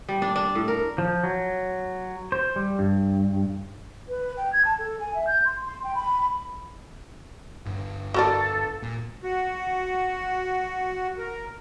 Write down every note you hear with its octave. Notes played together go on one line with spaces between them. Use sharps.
G3
D4
D4
A2
A#4
F3
F#3
C5
G3
G2
B4
G5
G#6
A5
A4
G#5
E5
G6
C6
C6
G5
B5
G1
F#4 A4 A#4 D5
A#2
F#4
A#4